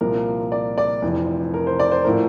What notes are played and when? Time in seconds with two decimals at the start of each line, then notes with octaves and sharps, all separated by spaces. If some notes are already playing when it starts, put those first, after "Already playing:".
0.01 C2 A#2 F3 A#4
0.52 D5
0.78 D5
1.02 F1 F2 E3
1.54 A#4
1.67 C5
1.80 D5
1.92 C5
2.04 A2 F3 A#4